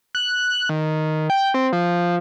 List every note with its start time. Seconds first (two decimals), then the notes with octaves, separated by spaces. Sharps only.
0.15 F#6
0.69 D#3
1.30 G5
1.54 C4
1.73 F3